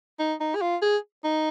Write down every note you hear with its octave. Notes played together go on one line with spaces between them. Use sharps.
D#4
D#4
G#4
F4
G#4
D#4